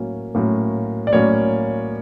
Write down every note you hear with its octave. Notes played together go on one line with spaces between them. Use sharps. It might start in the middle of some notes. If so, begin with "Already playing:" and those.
Already playing: A2 F#3 A#3 C#4
A2 F#3 A#3 C#4
D5
A2 F#3 A#3 C#4 C#5